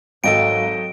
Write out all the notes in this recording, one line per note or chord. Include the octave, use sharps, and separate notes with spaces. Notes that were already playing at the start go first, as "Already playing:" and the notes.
G#1 F#3 A4 D#5 G5 D7